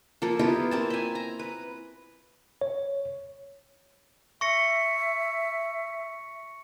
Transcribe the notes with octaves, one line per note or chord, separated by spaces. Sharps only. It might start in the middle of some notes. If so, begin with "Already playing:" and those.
F3 A#3 A4
B3 E4 F4 G4
A#3 C4 A5
E5 G#5
A#5
B4
C#5
E5 C#6 A#6 C#7